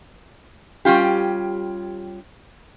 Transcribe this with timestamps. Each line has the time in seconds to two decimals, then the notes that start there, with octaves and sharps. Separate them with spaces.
0.85 G3 C#4 F4 G4